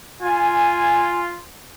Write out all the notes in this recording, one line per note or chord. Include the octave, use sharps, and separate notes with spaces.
F4 G#5